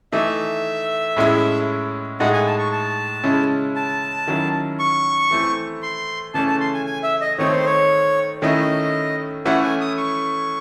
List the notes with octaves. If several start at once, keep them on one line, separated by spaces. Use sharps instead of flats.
E3 A3 D#4 E5
A2 G#3 C#4 E4
A2 G#3 D#4 F#5
G#5
A5
C#6
A5
C#3 G#3 C#4 E4
A5
D#3 F#3 C#4 E4
C#6
E3 A3 C4 E4
C6
C#3 E3 A3 C#4 A5
A5
C6
G#5
G#5
E5
D#5
D#3 A3 C4 D#4 C#5
C5
C#5
D#3 A3 C#4 E4 D#5
E3 A3 C#4 E4 F#5
G#5
D#6
C#6